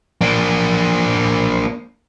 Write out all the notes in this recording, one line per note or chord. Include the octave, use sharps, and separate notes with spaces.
A#3 D4